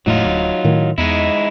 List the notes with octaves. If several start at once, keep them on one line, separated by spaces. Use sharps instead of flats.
E1 A2 F#3 A3 D#4 F4
D1
A2 D#3 A3
E2 G#3 D#4 E4